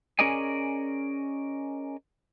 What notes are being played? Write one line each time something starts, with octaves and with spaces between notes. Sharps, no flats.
C#4 G#4 A#4 D5 D#5 G#5